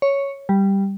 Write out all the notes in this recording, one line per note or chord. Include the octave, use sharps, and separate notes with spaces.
C#5
G3